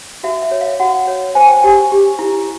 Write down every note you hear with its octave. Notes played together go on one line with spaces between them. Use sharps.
F#4 E5
E5
C#5
F5
F#4 F#5
C#5
C5 G#5
G5
G4 G#5
G4
E4